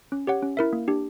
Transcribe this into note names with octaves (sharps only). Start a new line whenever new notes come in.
C#4
G4 C#5 F#5
C#4
E4 A#4 E5
A#3
D4 G4